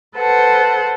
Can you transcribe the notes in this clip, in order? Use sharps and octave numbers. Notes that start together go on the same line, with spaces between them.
A4 B4 C5 F#5